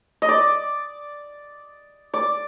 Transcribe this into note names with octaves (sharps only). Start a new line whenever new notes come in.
D#5
D5
D5